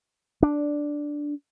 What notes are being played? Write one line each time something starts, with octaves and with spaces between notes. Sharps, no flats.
D4